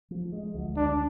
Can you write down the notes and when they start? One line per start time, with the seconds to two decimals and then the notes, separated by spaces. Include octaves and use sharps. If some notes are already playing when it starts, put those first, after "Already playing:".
0.11 F3
0.32 G#3
0.54 D2
0.76 D2 D4